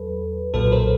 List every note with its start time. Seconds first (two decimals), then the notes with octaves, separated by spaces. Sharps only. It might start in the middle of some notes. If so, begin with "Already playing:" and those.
Already playing: E2 F#3 A4 B4
0.54 B1 A#2 F#3 A4 B4
0.72 A#4 C5